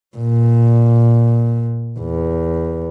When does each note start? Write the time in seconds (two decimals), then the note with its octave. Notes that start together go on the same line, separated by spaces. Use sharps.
0.17 A#2
1.99 E2